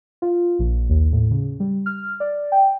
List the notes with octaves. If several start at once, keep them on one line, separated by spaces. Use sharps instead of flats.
F4
A#1
D#2
A2
C#3
G3
F6
D5
G5